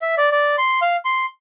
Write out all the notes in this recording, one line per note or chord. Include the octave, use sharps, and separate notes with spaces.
E5
D5
D5
C6
F5
C6